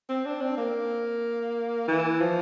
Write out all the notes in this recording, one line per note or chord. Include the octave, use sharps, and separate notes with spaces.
C4
D4
C4
A#3
E3
F3